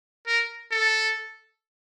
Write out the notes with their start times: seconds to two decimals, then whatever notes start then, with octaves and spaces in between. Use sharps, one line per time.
0.27 A#4
0.72 A4